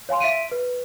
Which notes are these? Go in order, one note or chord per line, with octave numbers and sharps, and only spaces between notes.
C#5 F5 G#5 C6
E5 B6 D7 D#7
B4